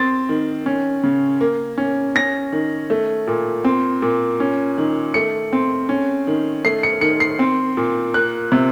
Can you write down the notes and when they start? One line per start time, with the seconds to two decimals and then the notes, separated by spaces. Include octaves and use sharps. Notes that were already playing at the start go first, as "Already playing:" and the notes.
Already playing: C4 A6
0.29 D#3
0.66 C#4
1.03 C#3
1.41 A#3
1.78 C#4
2.15 C#4 A#6
2.52 D#3
2.90 A3
3.27 A#2
3.64 C4
4.02 A#2
4.40 C#4
4.78 D#3
5.14 A3 C#7
5.53 C4
5.89 C#4
6.27 D#3
6.65 A3 C7
6.83 C#7
7.01 D#3 C#7
7.20 C7
7.39 C4
7.77 A#2
8.14 A#3 F#6
8.52 C3